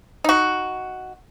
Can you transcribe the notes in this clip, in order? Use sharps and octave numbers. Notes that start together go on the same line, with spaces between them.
D#4 F#4